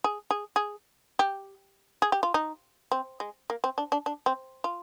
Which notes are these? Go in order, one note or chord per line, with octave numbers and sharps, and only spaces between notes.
G#4
G#4
G#4
G4
G#4
G4
F4
D#4
C4
G#3
A#3
C4
D4
D4
D4
C4
F4